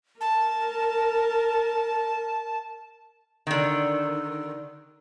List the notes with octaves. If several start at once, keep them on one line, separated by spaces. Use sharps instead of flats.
A#4 A5
D3 D#3